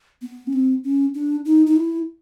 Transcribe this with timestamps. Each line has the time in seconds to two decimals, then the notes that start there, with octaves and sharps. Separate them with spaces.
0.22 B3
0.47 C#4
0.53 C4
0.84 C#4
1.14 D4
1.45 D#4
1.67 D#4
1.76 E4